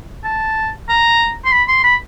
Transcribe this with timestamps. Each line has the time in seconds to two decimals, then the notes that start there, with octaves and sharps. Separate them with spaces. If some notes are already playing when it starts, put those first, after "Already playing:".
0.24 A5
0.89 A#5
1.45 C6
1.52 B5
1.68 C6
1.84 B5